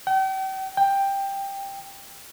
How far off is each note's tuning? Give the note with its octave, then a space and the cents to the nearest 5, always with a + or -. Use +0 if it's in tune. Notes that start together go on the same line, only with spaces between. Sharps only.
G5 -40
G5 +10